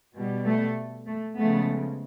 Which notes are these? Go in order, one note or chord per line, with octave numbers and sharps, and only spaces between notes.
B2 G3
A3
A3
C#3 F3 G#3 A3 B3